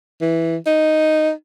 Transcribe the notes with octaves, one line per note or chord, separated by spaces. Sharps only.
E3
D#4